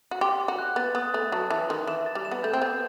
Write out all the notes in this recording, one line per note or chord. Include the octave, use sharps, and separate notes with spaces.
F#4
G4 C6
C6
F#4
F#6
B3 A6
B3 D#6
A3 A6
F#3 A5
E3 A5
D#3 C6
E3 E7
A6
G3
E7
B3
A3 G6
C4
B3 G6